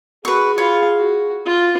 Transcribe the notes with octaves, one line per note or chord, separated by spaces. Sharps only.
F#4 G#4 B4 C#6
F4 C#5 F5 B5
F#4
F4